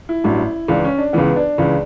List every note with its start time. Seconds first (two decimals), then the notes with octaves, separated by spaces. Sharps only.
0.09 E4
0.24 A1 G2 F#3
0.68 C#2 C#3 E3 D4
0.84 C#4
0.98 D4
1.13 C#2 C#3 E3 B3
1.36 D4
1.58 C#2 C#3 E3